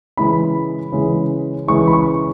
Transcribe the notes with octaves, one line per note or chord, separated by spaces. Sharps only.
C#3 E3 G#3 B5
C#3 E3 G#3
C#3 E3 G#3 C#6
B5
C#6